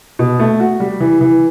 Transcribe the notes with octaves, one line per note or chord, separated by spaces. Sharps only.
B2
A3
F#4
G3
E3
E3